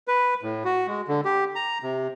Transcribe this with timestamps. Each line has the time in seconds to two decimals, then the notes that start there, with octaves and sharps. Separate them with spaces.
0.08 B4
0.43 A2
0.65 F#4
0.88 G#3
1.08 D3
1.25 G4
1.55 A#5
1.83 C3